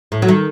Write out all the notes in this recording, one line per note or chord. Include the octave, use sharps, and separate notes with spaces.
A2
F#3
D#3